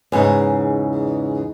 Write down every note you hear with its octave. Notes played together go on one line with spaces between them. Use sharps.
E2 G#2 C#3 D#4